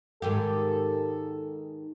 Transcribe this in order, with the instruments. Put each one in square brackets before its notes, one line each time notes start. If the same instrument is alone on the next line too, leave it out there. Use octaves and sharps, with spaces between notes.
[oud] G#2 D#3 G4 [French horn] A4